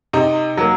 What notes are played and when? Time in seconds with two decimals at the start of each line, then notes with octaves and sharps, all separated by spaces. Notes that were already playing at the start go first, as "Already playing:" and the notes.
0.13 C3 D#4
0.57 F#3 A#3